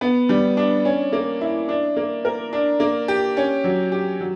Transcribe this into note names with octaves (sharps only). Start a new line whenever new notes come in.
B3
G3
D4
C#4
A#3
E4
D4
A#3
A#4
D4
A#3
G4
C#4
F#3
G4
F#3